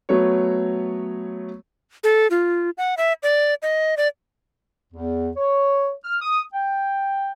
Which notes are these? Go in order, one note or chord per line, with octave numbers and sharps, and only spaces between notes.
F#3 A3 B3 F#4 C#5
A4
F4
F#5
E5
D5
D#5
D5
E2
C#5
F6
D#6
G5